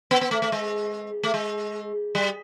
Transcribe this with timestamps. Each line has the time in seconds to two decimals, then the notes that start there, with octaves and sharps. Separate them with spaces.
0.11 B3
0.21 B3
0.31 A3
0.42 A3
0.52 G#3
1.23 A3
1.34 G#3
2.15 G3